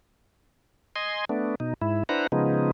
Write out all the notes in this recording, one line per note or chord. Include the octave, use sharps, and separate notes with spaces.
D#5 G#5 C6
A3 B3 D4
B2 D#4
G#2 E4
D4 E4 B4 C5 F#5 A#5
C#3 F3 G#3 B3 D#4